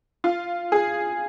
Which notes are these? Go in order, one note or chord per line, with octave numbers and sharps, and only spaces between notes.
F4
G#4